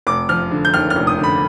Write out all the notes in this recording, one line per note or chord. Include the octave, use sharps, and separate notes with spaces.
F1 D6
F3 F6
D3
G6
D#2 F6
F6
F1
D#6
D3
B5